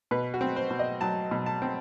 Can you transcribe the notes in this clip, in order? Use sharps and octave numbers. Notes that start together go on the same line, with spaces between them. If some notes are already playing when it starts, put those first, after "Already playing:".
B2 B4
F#4
C4
C5
B2
D#5
F#3 A5
B2
A5
C4